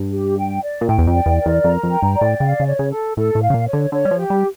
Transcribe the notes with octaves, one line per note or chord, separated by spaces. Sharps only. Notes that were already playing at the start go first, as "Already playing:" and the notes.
Already playing: G2
G4
G5
D5
A#2
A2 G5
E2
F2
D5
E2
A#4
E2
F2 A#5
F2
G5
G2
D5
A2
C#3 F5
C#3
C#5
C#3
A4
A2 A4
A2
F5
C#3
A#2
C#5
D3
D3 C#5
G3
F3
G4
G3